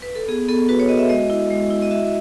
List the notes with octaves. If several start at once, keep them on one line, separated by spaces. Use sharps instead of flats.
B4
A4
B3 G#4
B3 A4
F#4 B4
C#5
F#4 D#5
E5
G#3 D#5
E4
G#3
E4
D#5
F#4 E5